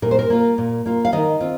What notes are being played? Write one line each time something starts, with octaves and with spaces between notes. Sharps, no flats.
A#2 A#4
C5
A#4
A#3 F4
A#2
A#3 F4
F5
D#3 D#5
C4 F4